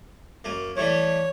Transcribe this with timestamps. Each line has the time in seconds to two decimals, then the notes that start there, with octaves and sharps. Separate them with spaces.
0.44 F#2 A#3
0.77 E3 G3 A3 C#5